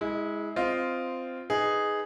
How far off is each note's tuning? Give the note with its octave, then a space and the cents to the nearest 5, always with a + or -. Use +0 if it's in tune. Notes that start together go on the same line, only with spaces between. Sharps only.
G#3 +0 E4 -25
C4 -10 F4 -5 D#5 +0
D#4 +0 G#4 +0 B4 +10